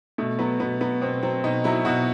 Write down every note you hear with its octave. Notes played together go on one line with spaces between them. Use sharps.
B2 A3
F#3 B3
B2 B3
F#3 B3
B2 C4
F#3 C4
B2 D#4
F#3 E4
B2 F#4